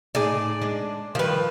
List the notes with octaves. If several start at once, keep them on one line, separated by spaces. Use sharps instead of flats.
A2 D#4 G#4 D5
G#3 D4
D#3 F3 G3 B4